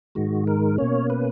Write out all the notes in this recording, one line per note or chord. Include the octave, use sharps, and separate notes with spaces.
G#2 D#3 G#3 F#4
A#4
B2 A#3 C#4 C#5
B4